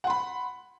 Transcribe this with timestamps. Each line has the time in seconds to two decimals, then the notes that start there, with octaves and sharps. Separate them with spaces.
0.04 F#5
0.07 C6
0.10 B5